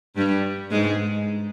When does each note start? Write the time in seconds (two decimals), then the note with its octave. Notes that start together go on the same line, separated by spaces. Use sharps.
0.16 G2 G3
0.71 G#2 G#3